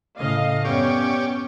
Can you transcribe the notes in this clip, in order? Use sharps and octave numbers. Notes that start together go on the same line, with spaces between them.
A2 C#3 D#5 F5
F#2 B3 C#4 G4 C#5 D5